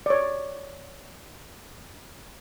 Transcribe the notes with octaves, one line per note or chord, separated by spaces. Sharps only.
C#5 D5